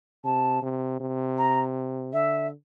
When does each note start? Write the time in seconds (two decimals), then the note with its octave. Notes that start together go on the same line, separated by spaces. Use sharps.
0.24 C3 A5
0.62 C3
1.00 C3
1.38 A#5
2.13 D3 E5